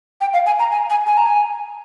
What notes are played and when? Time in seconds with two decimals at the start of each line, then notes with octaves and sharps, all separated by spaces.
0.21 G5
0.33 F5
0.46 G#5
0.59 A#5
0.72 G#5
0.90 G#5
1.07 G#5
1.17 A#5
1.26 G#5